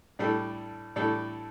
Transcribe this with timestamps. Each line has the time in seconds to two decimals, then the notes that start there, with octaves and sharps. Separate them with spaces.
0.19 A2 G3 D4 A4
0.96 A2 G3 D4 A4